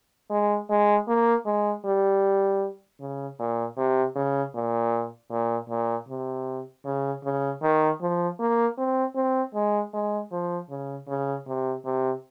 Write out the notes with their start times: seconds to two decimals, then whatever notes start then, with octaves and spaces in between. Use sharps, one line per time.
0.31 G#3
0.70 G#3
1.08 A#3
1.46 G#3
1.85 G3
3.00 C#3
3.39 A#2
3.78 C3
4.16 C#3
4.55 A#2
5.31 A#2
5.69 A#2
6.08 C3
6.85 C#3
7.24 C#3
7.62 D#3
8.01 F3
8.40 A#3
8.78 C4
9.15 C4
9.54 G#3
9.94 G#3
10.32 F3
10.70 C#3
11.08 C#3
11.47 C3
11.85 C3